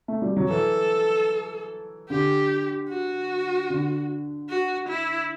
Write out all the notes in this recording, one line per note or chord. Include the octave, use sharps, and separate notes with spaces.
A3
G3
F#3
E3 A4
D3 G4
F#4
D3
F#4
E4